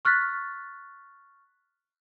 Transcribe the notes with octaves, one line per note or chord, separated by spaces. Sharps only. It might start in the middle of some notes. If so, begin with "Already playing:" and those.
C#6 F6 F#6 A6 B6